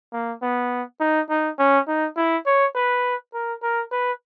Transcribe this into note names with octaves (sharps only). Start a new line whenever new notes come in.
A#3
B3
D#4
D#4
C#4
D#4
E4
C#5
B4
A#4
A#4
B4